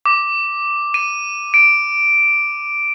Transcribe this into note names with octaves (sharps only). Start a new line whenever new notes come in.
D6
D#7
D7